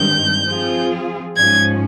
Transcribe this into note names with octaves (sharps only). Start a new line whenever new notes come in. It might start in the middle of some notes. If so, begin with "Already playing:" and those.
Already playing: G2 D#3 G#3 C4 G6
F3 C4 F4 G#4
G#2 F3 G#3 C#4 G#6